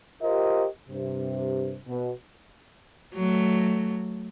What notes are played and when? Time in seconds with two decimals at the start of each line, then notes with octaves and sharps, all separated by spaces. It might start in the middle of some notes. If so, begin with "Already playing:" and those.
0.23 F4 G4 A#4 C5 D#5
0.89 G2 C3
1.88 B2
3.15 F#3 A3